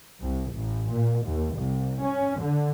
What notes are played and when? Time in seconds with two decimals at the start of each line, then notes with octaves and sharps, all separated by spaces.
0.22 C2
0.55 A1
0.90 A#2
1.26 D#2
1.56 C2
2.04 C#4
2.40 D3